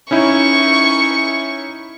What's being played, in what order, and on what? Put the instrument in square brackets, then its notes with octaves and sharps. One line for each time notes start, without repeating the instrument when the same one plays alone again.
[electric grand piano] C#4 D#4 E4 [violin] C#6